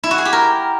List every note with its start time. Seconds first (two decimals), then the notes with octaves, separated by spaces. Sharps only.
0.04 E4
0.11 F#4
0.18 G#4
0.25 G4
0.33 A#4